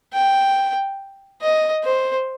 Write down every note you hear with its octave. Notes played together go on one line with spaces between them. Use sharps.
G5
D#5
C5